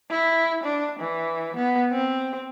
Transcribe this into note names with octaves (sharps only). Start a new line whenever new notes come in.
E4
D4
E3
B3
C4